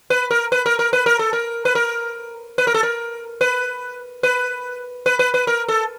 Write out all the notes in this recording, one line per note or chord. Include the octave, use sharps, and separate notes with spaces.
B4
A#4
B4
A#4
A#4
B4
A#4
A4
A#4
B4
A#4
B4
A#4
A4
A#4
B4
B4
B4
B4
B4
A#4
A4